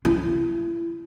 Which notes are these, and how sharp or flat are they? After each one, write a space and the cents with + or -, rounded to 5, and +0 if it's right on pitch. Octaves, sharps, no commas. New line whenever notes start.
E4 +35